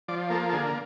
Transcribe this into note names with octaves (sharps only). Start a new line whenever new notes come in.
F3 D5
A#3 A4
A4
D3 G#4